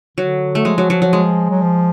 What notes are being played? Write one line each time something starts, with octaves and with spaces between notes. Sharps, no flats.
D3 F#3
A3
F3 G#3
F#3
F#3
F#3
G#3
F#3
F3